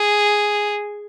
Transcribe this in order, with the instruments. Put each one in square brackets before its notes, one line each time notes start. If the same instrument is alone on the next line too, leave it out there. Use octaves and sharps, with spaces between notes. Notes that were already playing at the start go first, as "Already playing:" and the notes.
Already playing: [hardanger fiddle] G#4